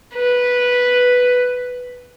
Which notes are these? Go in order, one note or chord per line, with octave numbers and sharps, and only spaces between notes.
B4